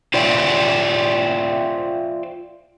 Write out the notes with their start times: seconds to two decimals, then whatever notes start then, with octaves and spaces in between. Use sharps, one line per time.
0.14 F4 C5 D5 E5 G5